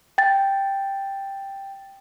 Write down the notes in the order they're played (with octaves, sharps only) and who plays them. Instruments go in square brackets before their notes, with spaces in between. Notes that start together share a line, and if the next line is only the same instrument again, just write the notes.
[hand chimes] G5 A6